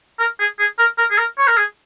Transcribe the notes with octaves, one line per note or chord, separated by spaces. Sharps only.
A#4
G#4
G#4
A#4
A#4
G#4
A#4
C#5
A#4
G#4